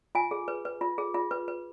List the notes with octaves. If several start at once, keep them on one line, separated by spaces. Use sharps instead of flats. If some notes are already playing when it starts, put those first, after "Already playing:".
F4 G#5
G#4
B4
B4
F4
G#4
F4
B4
B4